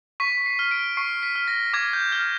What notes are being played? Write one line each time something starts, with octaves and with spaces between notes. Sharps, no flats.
C#6 B6
C7
F6
D7
C#6 C7
B6
F6
A#6
D6 G#6
G6
F6 G#6